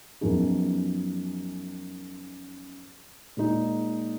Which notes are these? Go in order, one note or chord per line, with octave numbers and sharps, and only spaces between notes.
F#2 F3 B3 D#4 G#4
A#2 G#3 D#4 G#4